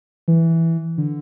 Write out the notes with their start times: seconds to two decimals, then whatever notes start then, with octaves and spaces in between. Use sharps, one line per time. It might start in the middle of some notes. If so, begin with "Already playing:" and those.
0.28 E3
0.98 D3